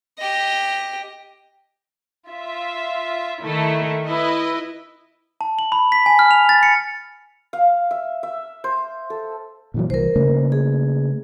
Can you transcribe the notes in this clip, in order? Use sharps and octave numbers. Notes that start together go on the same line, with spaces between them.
G4 D#5
F4 E5
D#3 A3 E4
E4 B4 D#5
A5
F#7
B5
B6
G#5
F6
F7
A6
C#7
F5
E5
E5
C5
A4
A#2 E3 F#3
C2 E3 A#4 C5
C#3 A3 A#3
G#4